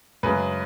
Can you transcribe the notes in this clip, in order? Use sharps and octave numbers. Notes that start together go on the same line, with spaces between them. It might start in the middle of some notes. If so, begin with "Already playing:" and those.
F#2 C#3 G#3 B4